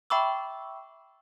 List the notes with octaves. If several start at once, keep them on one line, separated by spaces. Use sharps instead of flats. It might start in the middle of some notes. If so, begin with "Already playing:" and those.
E5 G5 B5 C#6 D6 E6